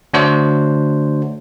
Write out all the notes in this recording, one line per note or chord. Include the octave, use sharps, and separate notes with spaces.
D3 A3 D4 F#4 C5 C#5